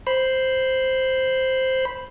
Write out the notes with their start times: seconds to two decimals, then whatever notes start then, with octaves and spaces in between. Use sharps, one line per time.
0.07 C5 B5